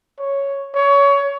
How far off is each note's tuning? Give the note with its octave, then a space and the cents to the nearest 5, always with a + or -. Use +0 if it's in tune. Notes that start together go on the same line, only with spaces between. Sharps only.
C#5 +0
C#5 +20